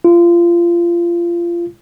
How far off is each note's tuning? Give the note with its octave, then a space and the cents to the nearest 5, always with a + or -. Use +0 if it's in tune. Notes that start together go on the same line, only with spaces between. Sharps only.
F4 -25